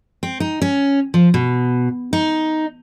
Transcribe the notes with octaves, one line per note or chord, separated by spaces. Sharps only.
C4
D#4
C#4
F3
B2
D#4